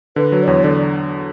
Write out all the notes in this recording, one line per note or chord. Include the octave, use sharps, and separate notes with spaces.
D3 B4
F#3
D5
E2 C#5
D3 D5